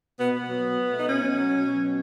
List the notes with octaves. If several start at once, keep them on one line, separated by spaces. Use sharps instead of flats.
B2 B3
B2 B3
F#3
B2
B2
A3
D#4
B2 C#4
F#3
F#3
B2
F#3
B2